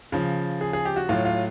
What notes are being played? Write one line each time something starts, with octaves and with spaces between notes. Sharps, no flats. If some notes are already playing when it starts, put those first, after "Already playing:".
C#3 F3
G#4
G#4
G4
F#4
A2 F#3 F4
F4